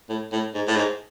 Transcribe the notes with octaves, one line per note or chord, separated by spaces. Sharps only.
A2
A2
G#2
A2
G#2